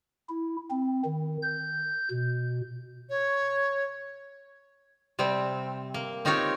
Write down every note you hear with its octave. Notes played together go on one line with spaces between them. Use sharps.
E4
C4
D#3
G6
B2
C#5
C3 G3 C4
A#3
C4 D#4 F4 G4 C#5